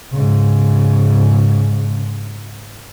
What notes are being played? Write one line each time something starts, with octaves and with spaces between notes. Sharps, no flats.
G#2 C#3